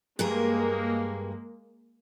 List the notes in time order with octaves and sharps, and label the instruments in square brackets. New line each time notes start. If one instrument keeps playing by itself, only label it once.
[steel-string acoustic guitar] G2 G#4 A#4 [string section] G#3 A#3